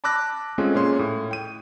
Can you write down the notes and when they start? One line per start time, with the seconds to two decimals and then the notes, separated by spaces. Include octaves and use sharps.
0.04 A5 B5 D6 E6 F#6 A#6
0.58 G#3 A3 C4 C#4 F4 G#4
0.75 A#2 C#4 G#4 C#5 C6
0.99 A2
1.31 G5 D#7